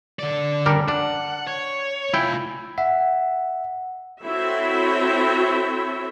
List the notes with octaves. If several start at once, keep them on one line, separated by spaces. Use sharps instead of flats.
D3 D5
G3 D4 A#4
D4 F#5
C#5
E4 F4 G5 G#5
E5 F#5
C4 E4 F#4 A4 C#5 E5